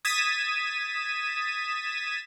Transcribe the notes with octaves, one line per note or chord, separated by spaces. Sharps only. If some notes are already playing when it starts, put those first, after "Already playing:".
D#6 G#6 A6 B6 D#7 E7